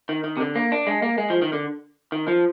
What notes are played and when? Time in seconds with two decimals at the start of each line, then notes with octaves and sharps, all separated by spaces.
0.09 D#3
0.24 D#3
0.37 C3
0.40 D3
0.55 A#3
0.72 D4
0.87 G#3
1.02 A#3
1.18 G#3
1.30 F3
1.42 D#3
1.53 D3
2.12 D#3
2.28 F3